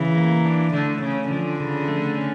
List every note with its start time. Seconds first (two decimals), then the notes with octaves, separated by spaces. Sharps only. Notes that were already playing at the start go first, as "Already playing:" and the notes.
Already playing: C#3 E3
0.16 A#3
0.45 D4
0.74 D3 A3
1.02 C#3 C#4
1.30 D3 F3
1.60 C#3
1.88 A3
2.18 C#4